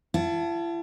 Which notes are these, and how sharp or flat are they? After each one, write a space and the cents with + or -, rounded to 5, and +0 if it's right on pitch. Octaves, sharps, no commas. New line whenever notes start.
E4 +45 F#5 +15 A5 -5